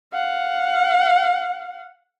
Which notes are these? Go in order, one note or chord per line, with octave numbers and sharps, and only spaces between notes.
F5 F#5